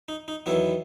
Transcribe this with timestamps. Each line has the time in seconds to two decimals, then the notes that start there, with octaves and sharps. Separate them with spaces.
0.08 D#4
0.28 D#4
0.46 E2 D#3 F#3 B3 E4